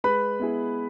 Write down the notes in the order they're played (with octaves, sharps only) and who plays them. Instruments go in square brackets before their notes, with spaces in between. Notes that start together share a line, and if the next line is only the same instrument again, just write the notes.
[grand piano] G#3 [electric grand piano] B4 B5
[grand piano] B3 E4 G#4